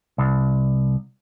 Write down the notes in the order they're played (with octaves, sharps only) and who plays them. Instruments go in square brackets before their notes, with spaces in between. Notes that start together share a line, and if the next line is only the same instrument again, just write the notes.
[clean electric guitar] C2